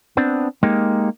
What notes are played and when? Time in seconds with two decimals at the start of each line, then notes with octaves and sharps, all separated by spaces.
0.17 B3 C4 D4
0.63 G#3 A#3 D#4 G4